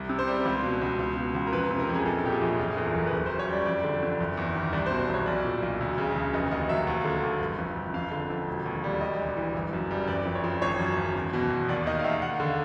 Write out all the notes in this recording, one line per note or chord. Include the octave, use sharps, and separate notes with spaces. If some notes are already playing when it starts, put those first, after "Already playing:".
Already playing: C2
C3
C5
G3
C#2
B2
C#2
C#2
B2
C#2
A#4
F2 B4
C3
A#4
F2
G#4
A#1 A4
A#2 G4
G#4
A#1
F#1 F4
G#4
E2 A4
A#4
F#1
B4
F#1 A#4
C5
F#2
C#5
G3
D5
F2 D5
D3
F2
F#1
E2
D#3
C2 D5
C5
B2
C5
C2 C#5
B1 D5
A#2
B1
D2
C#3
D2
F1 D#5
D#2 D#5
F#3 E5
D#2
D3
D#2
G1
F2
G1
F2 F5
D3
F2
E1
D#2
G3
E1 D#5
D2
E3
G1
F#2
G3
F#1 D5
F2
C#5
F3
G#1 C#5
F#2
G#1
E2
B2
E2
D#2 D5
D#3 D#5
F5
D#2 E5
D#2 F#5
D3 F5